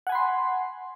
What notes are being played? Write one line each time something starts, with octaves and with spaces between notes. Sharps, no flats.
F#5 G#5 B5 C6